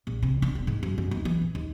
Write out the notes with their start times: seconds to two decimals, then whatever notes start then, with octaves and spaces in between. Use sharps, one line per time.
0.07 A#1
0.22 C3
0.42 D4
0.55 E1
0.67 G#2
0.83 F#2
0.98 F#2
1.11 D#2
1.25 E3
1.42 A#1
1.55 D#2